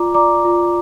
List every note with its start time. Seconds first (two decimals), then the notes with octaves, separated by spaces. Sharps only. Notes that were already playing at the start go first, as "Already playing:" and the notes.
Already playing: F4 D5 A#5 D6
0.14 D5 A#5 D6
0.44 F4